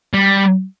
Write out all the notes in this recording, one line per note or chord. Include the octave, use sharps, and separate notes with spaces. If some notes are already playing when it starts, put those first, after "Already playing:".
G3